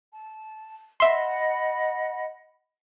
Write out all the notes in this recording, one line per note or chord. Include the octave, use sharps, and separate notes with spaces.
A5
D#5 E5 F#5 B5 C6